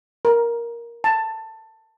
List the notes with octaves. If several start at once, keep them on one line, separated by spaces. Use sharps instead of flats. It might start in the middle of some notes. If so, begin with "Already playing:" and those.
A#4
A5